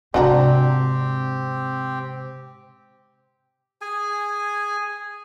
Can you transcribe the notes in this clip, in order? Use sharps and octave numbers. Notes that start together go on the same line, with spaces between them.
G#2 C3 C4 D4 F#4 G4 A#5
G#4 G#5